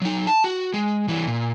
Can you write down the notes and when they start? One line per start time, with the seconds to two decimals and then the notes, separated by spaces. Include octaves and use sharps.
0.02 F#3 D#4
0.27 A5
0.44 F#4
0.74 G#3
1.08 E3 G3
1.27 A#2